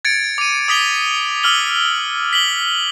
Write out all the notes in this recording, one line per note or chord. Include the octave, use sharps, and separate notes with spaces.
G#6 A6 C#7 D7
D6 D#7
D6 D#6 B6 F7 G7
D6 E6 F6 F#7 G7
B6 F#7 G7